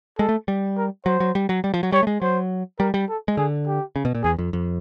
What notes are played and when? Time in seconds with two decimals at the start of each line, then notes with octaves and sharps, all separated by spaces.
0.19 G#3 A4
0.29 A3
0.48 G3
0.77 A#4
1.06 F#3 C5
1.20 F#3
1.35 G3
1.49 F#3
1.64 G3
1.74 F3
1.83 F#3
1.92 G3 C#5
2.03 A3
2.07 G#3
2.22 F#3 C5
2.79 G3 A#4
2.94 G3
3.09 A4
3.28 G#3
3.37 D3 G#4
3.66 G4
3.96 C#3
4.05 B2
4.15 A#2
4.24 E2 G#4
4.38 F2
4.53 F2